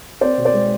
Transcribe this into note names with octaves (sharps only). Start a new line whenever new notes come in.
C4 C5 D5
B2
C5 D5
G#3